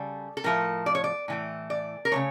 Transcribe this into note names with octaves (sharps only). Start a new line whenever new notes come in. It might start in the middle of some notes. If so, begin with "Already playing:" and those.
Already playing: C#3 G3 A4
A4
A2 F3 A3 A#4
D5
C#5
D5
A2 E3 A3
D5
A#4
C#3 F3 A3 C#5